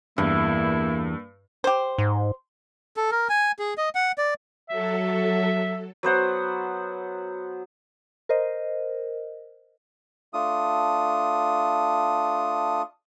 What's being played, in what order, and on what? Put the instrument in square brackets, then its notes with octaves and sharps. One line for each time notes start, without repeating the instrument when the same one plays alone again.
[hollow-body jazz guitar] E2 [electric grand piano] G2 [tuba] A#3 [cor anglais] E4
[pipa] G4 C5
[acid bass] G#2
[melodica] A4
A#4
G#5
G#4
D#5
F#5
D5
[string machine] F#3 A4 [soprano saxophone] E5
[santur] F#3 B3 C5 F#5
[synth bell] A#4 C5 D#5
[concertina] A3 D4 F4 D#6